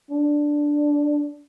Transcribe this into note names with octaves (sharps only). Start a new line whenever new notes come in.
D4